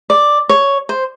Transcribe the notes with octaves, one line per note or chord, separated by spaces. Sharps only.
D5
C#5
C5